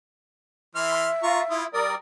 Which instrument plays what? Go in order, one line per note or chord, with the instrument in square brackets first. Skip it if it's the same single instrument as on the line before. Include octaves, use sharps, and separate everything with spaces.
[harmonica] E3 C6 F6 [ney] E5
[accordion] F4 [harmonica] A#5 C#6
[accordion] E4 [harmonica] F4 D#6
[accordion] G3 A#4 D5 [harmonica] D#6